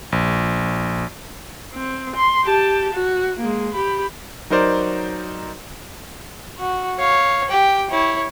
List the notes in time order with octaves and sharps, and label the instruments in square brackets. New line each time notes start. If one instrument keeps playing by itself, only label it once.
[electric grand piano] A#1
[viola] C4
C6
G4 A5
F#4
G#3 A#3
G4 B5
[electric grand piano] F#3 D#4 A#4 C5 D5
[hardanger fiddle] F#4
C#5 F5
G4 G5
E4 C#5